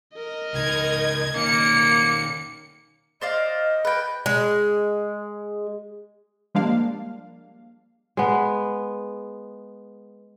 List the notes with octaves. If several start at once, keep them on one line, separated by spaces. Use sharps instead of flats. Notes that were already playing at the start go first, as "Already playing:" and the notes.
A#4 D#5
C#2 D#4 G#6
D#3 A#3 C#4 C#7
C5 D5 D#5 F5
B4 G5
G#3
F3 G3 G#3 A#3 D4 F5
G#3 B3